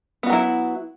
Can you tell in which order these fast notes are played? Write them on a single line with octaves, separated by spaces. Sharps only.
B3 F#4 F#3 E4